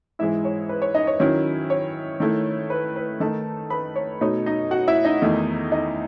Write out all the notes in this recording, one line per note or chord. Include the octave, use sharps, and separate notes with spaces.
G#2 E3 G#3 E4 E5
C#5
B4
C#5
D#4 D#5
C#5
D#3 F#3 C#4 E4
C#5
D#3 A3 E4
B4
B4
D#3 A3 D#4 A4 A5
B4 B5
C#5
B2 A3 D#4 C#5
D#4 D#5
F#4 F#5
E4 E5
D#4 D#5
E2 D#3 A3 E4
D#4 D#5